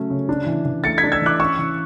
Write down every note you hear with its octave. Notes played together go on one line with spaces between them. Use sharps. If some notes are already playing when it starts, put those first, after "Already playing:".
Already playing: C#3 F#3 A3 C#4
C#3
D4
E3
E3
A3 A6 C#7
G#6 B6
D4
E6 G#6
E3 D6 F#6
C#4 C#6 E6
E3